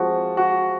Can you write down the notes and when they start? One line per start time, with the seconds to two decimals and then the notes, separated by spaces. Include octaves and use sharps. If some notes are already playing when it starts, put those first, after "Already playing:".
Already playing: F3 G#3 C4 F4 F#4
0.37 F#4